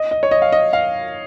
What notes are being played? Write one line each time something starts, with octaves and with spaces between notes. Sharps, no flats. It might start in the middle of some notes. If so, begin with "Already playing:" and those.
Already playing: D#5
D#5
C#5
D#5
F5
D#5
F5